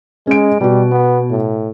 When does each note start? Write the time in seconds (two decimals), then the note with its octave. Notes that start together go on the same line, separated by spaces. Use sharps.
0.27 G#3 C#4 D#5 D7
0.61 B2 G3 F#4
0.92 B3
1.30 A2